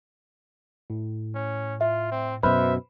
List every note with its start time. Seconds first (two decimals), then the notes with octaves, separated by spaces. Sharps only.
0.90 A2
1.35 C#4
1.81 F4 E5
2.11 C4
2.43 F#2 B2 B4 C5 E5 B5 F6